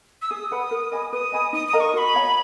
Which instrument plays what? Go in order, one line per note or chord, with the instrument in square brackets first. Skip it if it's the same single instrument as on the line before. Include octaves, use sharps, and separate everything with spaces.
[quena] E6
[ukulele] G#4 [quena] D#6
[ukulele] B4 F#5 B5
A#4
D#5 G#5 B5
[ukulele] B4 [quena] D#6
[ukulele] D#5 G#5 B5
[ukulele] D#4 [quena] D#6
[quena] D#6
[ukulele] A#4 D#5 A#5
[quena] C#6
[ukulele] F#4 [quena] B5 C#6
[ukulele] C#5 F#5 A#5